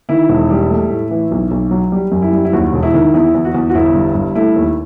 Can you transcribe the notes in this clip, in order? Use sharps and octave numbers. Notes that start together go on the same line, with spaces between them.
D#3 E4
E1
G3
A3
A2
E3
B1
B1
F#3
G3
F#2
E4
G3
E4
D#2 F#4
E1
E4
D#3
E2 E4
E2
F#4
E2
F#4
G1 E4
G2
G2
A3 E4
D#2